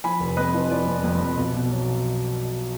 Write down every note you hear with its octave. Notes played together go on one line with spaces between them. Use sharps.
F3 G#5 B5
F1
F2 B4 D#5
F3
F3 D5
F2
F2
F2
B1
B2
F#3